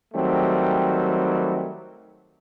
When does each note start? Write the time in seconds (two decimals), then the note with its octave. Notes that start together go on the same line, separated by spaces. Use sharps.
0.14 D#3 F#3 G3 A3 C4